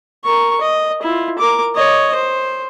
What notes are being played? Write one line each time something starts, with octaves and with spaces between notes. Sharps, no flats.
A#4 C#6
D#5
E4 F4
A#4 D6
C#5 D#5
C5